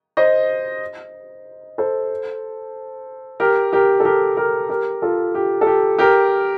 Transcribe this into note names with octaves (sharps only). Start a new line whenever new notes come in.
C5 D#5
A4 C5
G4 A#4
G4 A#4
A4
G4 A#4
G4 A#4
G4 A#4
F4 A4
G4
A4
G4
G4 A#4